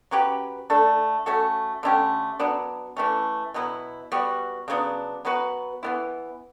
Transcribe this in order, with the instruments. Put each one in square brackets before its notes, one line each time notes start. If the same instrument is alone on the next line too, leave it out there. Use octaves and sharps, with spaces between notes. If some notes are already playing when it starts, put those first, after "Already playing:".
[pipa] F#3 C#4 G4 B4
A3 D4 A4
A3 C#4 F#4 A4
D3 A3 C#4 G4
F#3 B3 D4
E3 A3 C#4
B2 F#3 B3 E4
G3 B3 F#4
C#3 F#3 B3 D4
F#3 B3 F#4 B4
E3 B3 E4